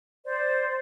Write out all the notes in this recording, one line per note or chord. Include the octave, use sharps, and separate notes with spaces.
C5 D5